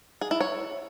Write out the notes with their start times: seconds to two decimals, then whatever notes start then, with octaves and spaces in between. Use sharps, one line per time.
0.21 G#4
0.31 E4
0.40 C#5